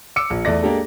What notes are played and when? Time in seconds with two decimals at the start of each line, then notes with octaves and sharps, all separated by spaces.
0.16 D6 E6 C#7
0.30 A#1
0.45 E2 A3 D5 A#6
0.63 G#3 A#3 D4 G4 A4